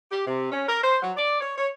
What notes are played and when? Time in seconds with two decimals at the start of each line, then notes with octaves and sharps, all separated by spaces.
0.12 G4
0.27 C3
0.52 C#4
0.68 A#4
0.83 C5
1.03 F#3
1.16 D5
1.41 C#5
1.57 C#5